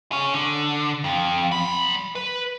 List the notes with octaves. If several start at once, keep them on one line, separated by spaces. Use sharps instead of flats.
G#4 C#5
D3
F2
F#3 B5
B4